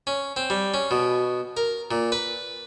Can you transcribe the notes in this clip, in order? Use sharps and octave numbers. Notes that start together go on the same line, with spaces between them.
C#4
C4
G3
C#4
B2
A#4
A#2
B4